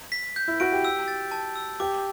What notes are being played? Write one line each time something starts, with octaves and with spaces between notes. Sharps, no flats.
B6
G6
E4
F#4 D7
G4
E6
A6
A5
E6
G4 D6